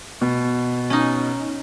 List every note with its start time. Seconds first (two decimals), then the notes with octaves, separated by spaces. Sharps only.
0.21 B2
0.90 C#4 D#4